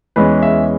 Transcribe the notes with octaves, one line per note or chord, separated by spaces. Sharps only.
E2 E3 G#3 C#4 B4
E5